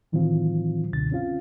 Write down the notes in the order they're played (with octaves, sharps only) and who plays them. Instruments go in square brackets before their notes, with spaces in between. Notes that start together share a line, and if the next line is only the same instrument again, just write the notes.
[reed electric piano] A2 D#3 E3 F#3 C4 F4
C#2 F#2 B2 D3 A6
C4 C#4 F4 F5